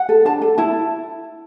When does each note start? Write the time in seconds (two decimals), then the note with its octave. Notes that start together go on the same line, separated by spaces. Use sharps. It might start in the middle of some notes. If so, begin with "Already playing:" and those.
Already playing: F#5
0.09 A4
0.25 D4 A5
0.42 A4
0.58 E4 A5